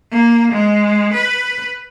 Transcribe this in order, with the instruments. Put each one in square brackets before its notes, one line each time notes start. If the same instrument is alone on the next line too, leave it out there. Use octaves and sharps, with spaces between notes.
[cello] A#3
G#3
B4